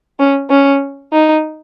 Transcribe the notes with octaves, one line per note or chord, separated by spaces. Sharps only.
C#4
C#4
D#4